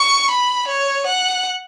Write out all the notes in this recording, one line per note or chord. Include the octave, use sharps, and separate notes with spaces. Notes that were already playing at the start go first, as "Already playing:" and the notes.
Already playing: C#6
B5
C#5
F#5